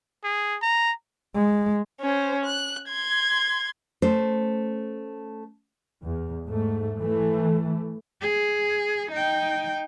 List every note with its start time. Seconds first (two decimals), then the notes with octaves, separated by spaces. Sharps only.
0.24 G#4
0.62 A#5
1.35 G#3
2.01 C#4 C5
2.45 F#6
2.88 C6 G#6
4.02 A3 C#4 C5
6.02 E2
6.47 G#2 A3
7.00 E3 A3
8.21 G#4
9.11 D#4 G5